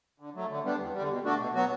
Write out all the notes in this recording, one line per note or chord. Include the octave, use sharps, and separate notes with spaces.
D3
F#3 A3
D3
G3 B3 D4
E2
G3
D3
B2
A3 D4 F#4
B2
F#3 B3 F#4